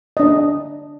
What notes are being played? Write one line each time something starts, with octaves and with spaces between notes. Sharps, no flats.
D4 D#5